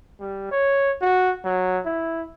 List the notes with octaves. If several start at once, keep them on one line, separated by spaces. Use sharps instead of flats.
G3
C#5
F#4
F#3
E4